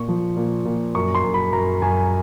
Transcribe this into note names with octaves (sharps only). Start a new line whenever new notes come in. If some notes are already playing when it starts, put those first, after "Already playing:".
Already playing: A#2 C#6
F3
A#2
A#2
F#2 C#6
C6
F#2
B5
F#2 A#5
F#2 G#5